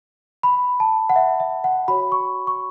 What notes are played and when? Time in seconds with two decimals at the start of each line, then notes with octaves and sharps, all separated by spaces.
0.43 B5
0.80 A5
1.09 F#5
1.16 E5
1.40 E5
1.64 F#5
1.88 F#4 C#5 B5
2.12 C#6
2.47 C#6